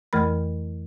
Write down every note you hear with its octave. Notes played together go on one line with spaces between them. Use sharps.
F2 E3 A3 A#4 B5